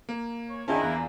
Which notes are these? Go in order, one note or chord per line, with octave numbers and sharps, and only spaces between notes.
A#3
C#5
D#3 C#4 D4 E4 F4 G#4 A#4 A5
E2 A#3 F#6